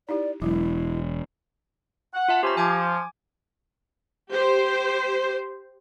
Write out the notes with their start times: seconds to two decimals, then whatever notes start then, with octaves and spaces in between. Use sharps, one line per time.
0.09 D#4 E4 G4 D5
0.42 E1 F#3 G#3 E4
2.14 F#5
2.28 F4 E5 A5
2.43 C#4 G4 C5 A#5
2.57 F3 G#5 D6 G#6
4.31 G4 C5